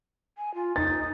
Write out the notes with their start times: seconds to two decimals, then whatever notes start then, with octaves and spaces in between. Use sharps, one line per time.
0.38 G#5
0.55 F4
0.76 D#4 A6